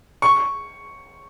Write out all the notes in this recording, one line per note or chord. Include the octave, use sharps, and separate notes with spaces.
C#6